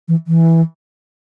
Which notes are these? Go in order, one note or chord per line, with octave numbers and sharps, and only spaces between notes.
E3
E3